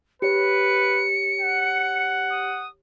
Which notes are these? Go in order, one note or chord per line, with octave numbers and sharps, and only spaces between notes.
G4 B4 C#5 C#7
F#5
D#6